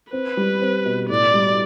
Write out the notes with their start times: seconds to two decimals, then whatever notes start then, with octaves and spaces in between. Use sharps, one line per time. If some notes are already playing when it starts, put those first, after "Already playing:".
0.13 C4 B4
0.37 G3
0.62 C4
0.86 B2
1.09 A2 D5
1.34 G3